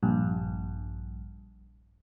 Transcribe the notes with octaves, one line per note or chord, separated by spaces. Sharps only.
A#1 G2